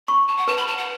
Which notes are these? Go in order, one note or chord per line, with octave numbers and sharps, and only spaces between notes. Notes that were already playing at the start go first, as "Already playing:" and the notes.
B5 C#6
A5
F#5
B4 A5
B5
A5
F#5